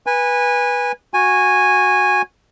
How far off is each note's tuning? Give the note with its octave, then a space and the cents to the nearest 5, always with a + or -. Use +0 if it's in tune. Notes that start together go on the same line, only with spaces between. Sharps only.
B4 -15 G#5 -20
F#4 -15 G#5 -10